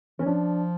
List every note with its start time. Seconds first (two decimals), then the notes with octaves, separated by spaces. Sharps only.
0.19 E3 C#4
0.26 F3 D4